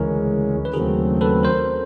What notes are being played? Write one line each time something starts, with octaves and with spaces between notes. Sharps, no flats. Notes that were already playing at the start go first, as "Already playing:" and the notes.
Already playing: D2 C#3 E3 G#3 C#4 G#4 A#4
B4
D#2 C#3 F#3 A3 C4 G#4 A#4
A4 B4
A#4 C5